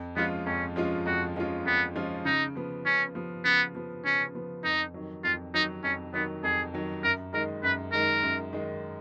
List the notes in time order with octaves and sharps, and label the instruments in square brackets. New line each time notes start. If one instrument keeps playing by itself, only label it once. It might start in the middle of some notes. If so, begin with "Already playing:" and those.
Already playing: [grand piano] F2
[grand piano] F3 G#3 C#4 F4 [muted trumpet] B3
[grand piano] F2 [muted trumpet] C#4
[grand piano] F3 G#3 C#4 F4
[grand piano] F2 [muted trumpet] F#4
[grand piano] F3 G#3 C#4 F4
[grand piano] F2 [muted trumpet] B3
[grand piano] F3 G#3 C#4 F4
[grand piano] C#3 [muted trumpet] D#4
[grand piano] F3 B3
[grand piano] C#3 [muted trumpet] C#4
[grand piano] F3 B3
[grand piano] C#3 [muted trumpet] B3
[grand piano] F3 B3
[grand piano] C#3 [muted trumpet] C#4
[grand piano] F3 B3
[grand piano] F2 [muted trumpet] D#4
[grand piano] D#3 F#3
[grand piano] F2 [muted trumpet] F4
[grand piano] D#3 F#3 [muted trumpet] D#4
[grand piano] F2 [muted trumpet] C#4
[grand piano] D#3 F#3 [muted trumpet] B3
[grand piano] F2 [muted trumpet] G#4
[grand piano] D#3 F#3
[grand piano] F#2 [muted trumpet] A#4
[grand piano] D#3 G#3 D#4 [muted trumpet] A#4
[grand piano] F#2 [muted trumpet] B4
[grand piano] D#3 G#3 D#4 [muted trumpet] A#4
[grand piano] F#2
D#3 G#3 D#4